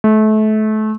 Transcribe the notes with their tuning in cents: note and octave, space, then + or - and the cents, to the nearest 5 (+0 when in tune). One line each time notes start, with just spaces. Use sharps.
A3 -30